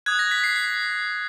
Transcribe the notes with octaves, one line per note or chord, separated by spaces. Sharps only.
D#6 F#6 G#6
A#6
B6
C7
C7